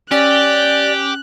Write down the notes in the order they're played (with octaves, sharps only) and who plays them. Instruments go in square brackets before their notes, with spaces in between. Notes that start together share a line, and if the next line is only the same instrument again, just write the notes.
[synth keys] C#4 [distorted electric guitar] G4 [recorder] D5 [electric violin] F#6